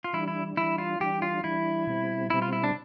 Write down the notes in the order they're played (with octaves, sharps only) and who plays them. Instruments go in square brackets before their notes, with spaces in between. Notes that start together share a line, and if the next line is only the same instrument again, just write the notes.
[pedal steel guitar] F4
[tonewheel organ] E3 G3 D4 [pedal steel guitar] E4
[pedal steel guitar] E4
[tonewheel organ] E3 G3 D4 [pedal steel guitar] E4
[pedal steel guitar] F4
[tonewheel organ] E3 G3 D4 [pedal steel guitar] G4
[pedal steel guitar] F4
[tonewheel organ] E3 G3 D4 [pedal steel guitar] E4
[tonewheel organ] B2 G3 C4
[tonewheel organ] B2 G3 C4 [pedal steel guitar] E4
[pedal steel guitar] F4
E4
D4